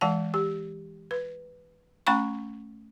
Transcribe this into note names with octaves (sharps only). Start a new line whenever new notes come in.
E3 G#3 F#5 A5
G4
B4
A3 C#4 G5 B5 C#6